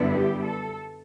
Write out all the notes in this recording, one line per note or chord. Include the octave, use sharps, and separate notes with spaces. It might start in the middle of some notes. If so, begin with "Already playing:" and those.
Already playing: F#2 D3 G3 B3 E4
G4
A4